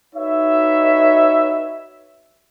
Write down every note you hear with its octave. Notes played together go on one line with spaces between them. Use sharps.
D#4 F#4 B4 C#5 E5